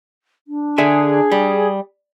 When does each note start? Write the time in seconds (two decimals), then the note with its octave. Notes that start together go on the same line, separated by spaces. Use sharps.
0.48 D4
0.78 D3 G#4 E5 G#5
1.32 G3